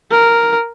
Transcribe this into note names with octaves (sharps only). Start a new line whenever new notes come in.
A#4